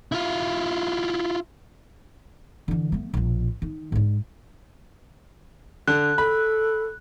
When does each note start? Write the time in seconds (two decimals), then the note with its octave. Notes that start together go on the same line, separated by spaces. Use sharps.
0.12 E4 F4
2.68 D3 E3
2.92 A3 B3
3.14 A#1 B2
3.62 D#3
3.92 G#2 D4
5.88 D3 F#6
6.18 A4 B5